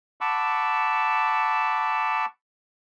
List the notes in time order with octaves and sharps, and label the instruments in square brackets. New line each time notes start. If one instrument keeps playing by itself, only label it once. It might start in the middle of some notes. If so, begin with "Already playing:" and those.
[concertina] F#5 A5 B5 C#6 D6 E6